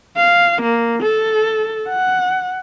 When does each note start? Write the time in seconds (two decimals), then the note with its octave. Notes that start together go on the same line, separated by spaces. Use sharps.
0.17 F5
0.62 A#3
1.03 A4
1.89 F#5